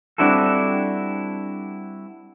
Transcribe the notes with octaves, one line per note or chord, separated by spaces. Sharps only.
G3 C4 D4 E4 F#4 A4